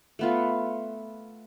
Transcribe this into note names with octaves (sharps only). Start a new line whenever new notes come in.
A3 B3 F4